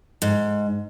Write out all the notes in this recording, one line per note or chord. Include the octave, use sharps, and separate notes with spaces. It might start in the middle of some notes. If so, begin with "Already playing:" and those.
G#2